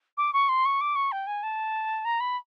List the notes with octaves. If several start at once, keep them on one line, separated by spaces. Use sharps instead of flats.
D6
C#6
C6
C#6
D6
C#6
G5
G#5
A5
A#5
B5